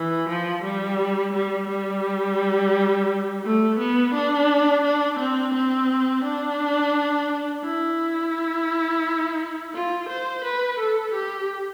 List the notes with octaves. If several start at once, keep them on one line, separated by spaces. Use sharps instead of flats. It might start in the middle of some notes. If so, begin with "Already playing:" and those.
Already playing: E3
F3
G3
G3
G3
A3
B3
D4
D4
C4
C4
D4
E4
F4
C5
B4
A4
G4